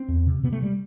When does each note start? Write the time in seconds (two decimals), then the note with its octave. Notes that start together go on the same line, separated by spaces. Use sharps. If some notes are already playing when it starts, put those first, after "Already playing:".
Already playing: C4
0.08 E2
0.27 C3
0.43 C3 B3
0.53 A3
0.63 G3